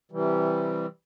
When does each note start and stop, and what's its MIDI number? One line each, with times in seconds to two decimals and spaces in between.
0.12 0.86 48
0.12 0.86 52
0.12 0.86 55